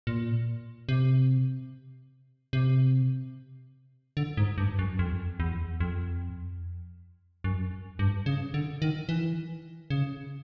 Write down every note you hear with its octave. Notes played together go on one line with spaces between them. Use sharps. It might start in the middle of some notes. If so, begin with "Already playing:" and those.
A#2
C3
C3
D3
G#2
G2
F#2
F2
E2
F2
F#2
G2
C#3
D3
D#3
E3
C#3